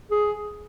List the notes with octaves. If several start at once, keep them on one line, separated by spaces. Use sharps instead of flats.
G#4